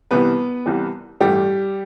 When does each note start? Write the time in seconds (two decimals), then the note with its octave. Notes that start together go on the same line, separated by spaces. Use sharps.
0.11 C2 C3 E3 G3 B3 B4
0.66 C2 C3 E3 G3
1.20 A1 G2 E3 G3 A3 G4